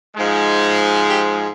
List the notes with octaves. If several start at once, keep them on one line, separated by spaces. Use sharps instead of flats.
G#2 F3 G#3
G4